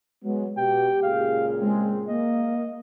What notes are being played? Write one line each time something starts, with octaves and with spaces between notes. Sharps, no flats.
F#3 G#3 B3
B2 G4 G5
C#2 A#2 G#4 F5
G#3 C4
A#3 D#5